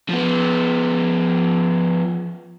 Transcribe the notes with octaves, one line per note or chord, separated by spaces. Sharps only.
F3 B3